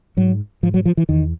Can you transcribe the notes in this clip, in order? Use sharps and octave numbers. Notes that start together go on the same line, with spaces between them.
G#2 F#3
G#2 F3
F#3
F3
E3
E2 D#3